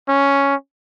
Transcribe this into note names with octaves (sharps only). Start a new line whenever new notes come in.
C#4